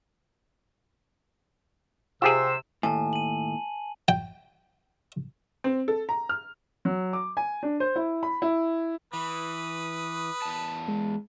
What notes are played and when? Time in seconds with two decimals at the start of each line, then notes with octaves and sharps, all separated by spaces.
2.22 C3 F4 G4 G#4 C5 E6
2.83 D#2 A2 G#5 A5
3.13 D#7 F#7
4.08 G5
5.64 C4
5.88 A4
6.09 A#5
6.29 F6
6.85 F#3
7.13 D6
7.37 G#5
7.63 D4
7.80 C5
7.96 E4
8.23 B5
8.42 E4
9.13 E3 B4 D#6
10.42 E2 A5
10.88 G#3